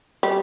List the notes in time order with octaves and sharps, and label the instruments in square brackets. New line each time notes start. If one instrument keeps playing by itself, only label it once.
[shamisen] G3